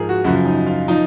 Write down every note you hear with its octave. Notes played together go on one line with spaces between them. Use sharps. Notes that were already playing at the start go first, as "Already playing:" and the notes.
Already playing: G#2 F3 G#4 A#4
F#4
F#2 C#3 F3 F#4
D#4
F4
F3 D#4